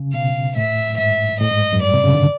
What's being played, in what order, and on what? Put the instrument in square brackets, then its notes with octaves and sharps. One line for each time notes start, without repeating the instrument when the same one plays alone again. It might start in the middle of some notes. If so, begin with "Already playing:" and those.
Already playing: [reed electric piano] C#3
[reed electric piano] B2 [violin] F5
[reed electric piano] A2 [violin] E5
[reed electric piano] G#2 [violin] E5
[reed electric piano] A2 [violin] D#5
[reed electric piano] G#2
F#2
[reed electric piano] G2 [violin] D5
[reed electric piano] C3
C#3
D3